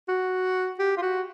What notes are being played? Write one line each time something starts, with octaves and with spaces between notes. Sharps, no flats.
F#4
G4
F4
F#4